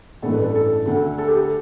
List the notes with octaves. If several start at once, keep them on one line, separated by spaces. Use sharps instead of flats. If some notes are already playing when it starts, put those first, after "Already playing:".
A1 G2 E3 A3 A4
B4
A4
A4
D2 D3 A3
A4
G4
A4